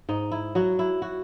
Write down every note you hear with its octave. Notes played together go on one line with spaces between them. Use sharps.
G#2 D#4
E4
F#3 F#4
E4
F#4